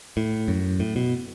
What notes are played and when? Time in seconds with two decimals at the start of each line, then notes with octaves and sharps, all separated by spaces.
0.17 A2
0.48 F#2
0.80 A2
0.96 B2